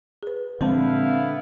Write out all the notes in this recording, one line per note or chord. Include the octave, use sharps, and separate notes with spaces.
G#4 B4
A#2 D3 F3 G#3 B3 C4 E4 F5